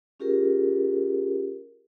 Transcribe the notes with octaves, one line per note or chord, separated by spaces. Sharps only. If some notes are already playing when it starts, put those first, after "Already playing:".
C#4 F4 G4 G#4 A#4